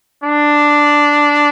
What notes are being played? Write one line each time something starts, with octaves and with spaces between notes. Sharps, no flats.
D4